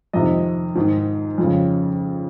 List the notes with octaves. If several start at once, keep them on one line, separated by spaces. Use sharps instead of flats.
F2 C3 D#3 D#5
G#2 D#3
F2 C#3